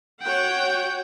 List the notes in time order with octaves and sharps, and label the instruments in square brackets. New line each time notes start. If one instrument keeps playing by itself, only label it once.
[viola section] F#4 C#5 F#5 [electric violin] G5 G6